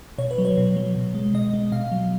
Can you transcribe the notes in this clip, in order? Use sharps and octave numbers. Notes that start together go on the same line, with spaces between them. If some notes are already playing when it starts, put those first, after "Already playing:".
B2 C#5
B4
F#3
C#5
B2
F#3
B2
G#3
B2 D#5
G#3
B2 F5
F#3